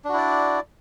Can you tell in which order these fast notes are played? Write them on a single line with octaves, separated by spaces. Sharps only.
D4 F#4 E4 D5